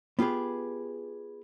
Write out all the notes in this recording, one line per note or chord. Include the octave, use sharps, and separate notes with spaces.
B3 F4 G4 G#4 B4